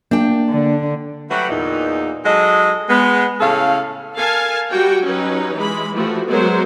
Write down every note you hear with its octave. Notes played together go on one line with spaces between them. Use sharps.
A#3 D4 G5
D3
F#3 G3 A3 F#4 G4 B4
E2 A#2 D#4
F#3 G#3 A4 D#5
G#3 B3
A2 C#3 A4 C#5 F5
A4 A#4 F5 G#5 A5
G3 F#4 G4 G5
F#3 C#4 D#4 B4
E3 G#3 B5
E3 F3 A3 F#4 G4
F#3 G#3 B3 A#4 C5